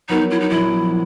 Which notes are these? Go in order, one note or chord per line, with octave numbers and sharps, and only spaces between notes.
F#3 B3 D#4 F#4 A#4
E4
D#4
A#1 E4